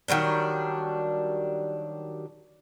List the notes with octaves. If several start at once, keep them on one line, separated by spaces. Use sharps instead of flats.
D#3 F#3 G3 D4